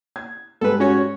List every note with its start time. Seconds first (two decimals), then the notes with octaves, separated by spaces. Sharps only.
0.16 G#6
0.61 G#2 G3 G#3 A4 B4
0.80 C#4 F#4 C#5